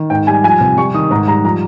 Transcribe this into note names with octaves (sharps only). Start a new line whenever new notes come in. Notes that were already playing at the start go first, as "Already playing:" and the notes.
Already playing: D#3
G#2 G5
G3 G#5
F3 G#5
C3
G3 C#6
D#3 D#6
G#2 A#5
G3 A#5
F3 A#5